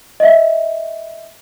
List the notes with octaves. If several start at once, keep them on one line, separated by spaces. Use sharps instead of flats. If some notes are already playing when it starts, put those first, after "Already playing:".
D#5 E5